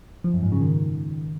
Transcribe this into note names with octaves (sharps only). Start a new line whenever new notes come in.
F3
F#2
G#2
C#3
D#3